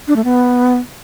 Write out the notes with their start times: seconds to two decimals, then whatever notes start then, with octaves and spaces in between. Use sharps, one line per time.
0.08 D4
0.16 A3
0.25 B3